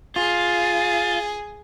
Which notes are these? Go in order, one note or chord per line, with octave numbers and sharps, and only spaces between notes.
F4 G#4